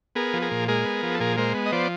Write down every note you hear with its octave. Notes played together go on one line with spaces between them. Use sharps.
B3 G#4 A#4
F3
G#4 A#4
A#2
G#3 G#4 A#4
B3
F3
A4
A#2 G#4 A#4
G#3 A#4 C5
B3
D#5
F3 C5 D5